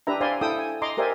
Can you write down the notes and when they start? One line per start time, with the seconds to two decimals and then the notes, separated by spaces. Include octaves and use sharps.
0.07 D4 G4 B4 E5 A#5
0.21 C5 D5 E5 F5 G#5 C6
0.41 E4 A4 G5 D#6 E6
0.59 G#5
0.82 D#5 A#5 C6 D6
0.97 G4 A#4 C5 D5 E5 G#5